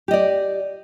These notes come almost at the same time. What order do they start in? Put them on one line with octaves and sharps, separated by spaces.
G4 D#5 D5